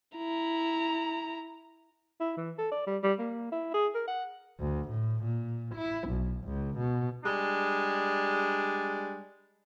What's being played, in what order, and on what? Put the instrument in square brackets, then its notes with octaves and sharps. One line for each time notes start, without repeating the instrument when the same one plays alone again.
[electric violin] E4 A#5
[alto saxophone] E4
E3
A4
D5
G3
G3
A#3
E4
G#4
A#4
F#5
[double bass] D2
A2
A#2
E4
B1
C#2
B2
[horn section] G3 G#3 D4